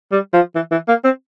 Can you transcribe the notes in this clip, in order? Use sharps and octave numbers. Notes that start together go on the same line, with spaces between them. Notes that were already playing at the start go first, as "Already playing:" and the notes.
G3
F3
E3
E3
A#3
C4